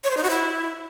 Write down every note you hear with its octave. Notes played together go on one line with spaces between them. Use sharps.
C#5
C5
D#4
F#4
E4